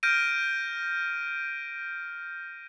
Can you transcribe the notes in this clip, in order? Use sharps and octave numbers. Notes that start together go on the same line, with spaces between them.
F6 G6 A#6 D7 D#7